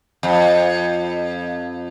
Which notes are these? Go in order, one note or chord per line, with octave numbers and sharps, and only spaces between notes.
F2